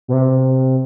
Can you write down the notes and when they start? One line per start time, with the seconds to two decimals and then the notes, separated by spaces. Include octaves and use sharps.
0.08 B2
0.13 C3